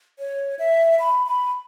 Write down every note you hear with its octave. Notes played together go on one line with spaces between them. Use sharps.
C#5
E5
B5
B5